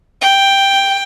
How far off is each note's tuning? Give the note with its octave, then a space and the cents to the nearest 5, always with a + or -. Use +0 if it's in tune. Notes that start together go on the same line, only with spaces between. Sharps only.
G5 +5